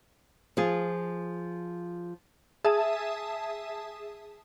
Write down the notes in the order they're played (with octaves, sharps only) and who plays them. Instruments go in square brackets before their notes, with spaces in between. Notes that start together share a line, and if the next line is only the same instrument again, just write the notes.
[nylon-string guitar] F3 F4 G#4
[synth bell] G#4 E5 A5 D#6